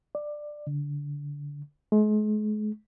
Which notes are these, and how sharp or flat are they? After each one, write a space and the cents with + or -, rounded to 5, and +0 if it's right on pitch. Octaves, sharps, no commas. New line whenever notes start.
D5 +15
D3 -25
G#3 +40